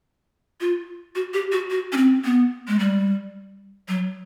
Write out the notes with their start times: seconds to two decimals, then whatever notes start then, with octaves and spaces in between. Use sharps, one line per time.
0.61 F4
1.15 F#4
1.34 G4
1.52 F#4
1.70 F#4
1.92 C#4
1.97 C4
2.25 B3
2.68 G#3
2.79 G3
3.88 F#3